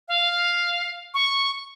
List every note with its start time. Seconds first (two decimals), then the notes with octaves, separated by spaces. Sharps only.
0.08 F5
1.14 C#6